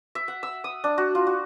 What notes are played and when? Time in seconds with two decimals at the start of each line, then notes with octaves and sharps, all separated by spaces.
0.15 E5
0.28 F#5
0.43 E6
0.64 D#6
0.84 D4
0.98 F#4
1.15 F4
1.27 F#4